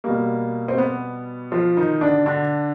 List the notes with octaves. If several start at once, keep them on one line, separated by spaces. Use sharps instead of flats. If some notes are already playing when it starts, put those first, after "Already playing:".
B2 G3 A#3
C4
B3
F3 F4
D#3 D#4
D3 D4
D3 D4